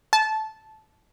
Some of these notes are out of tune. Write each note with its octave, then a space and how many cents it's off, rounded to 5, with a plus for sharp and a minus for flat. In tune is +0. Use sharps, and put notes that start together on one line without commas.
A5 -15